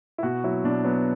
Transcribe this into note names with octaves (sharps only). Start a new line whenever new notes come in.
E4
B2 F#4
F#3 E4
B2 D4
F#3 B3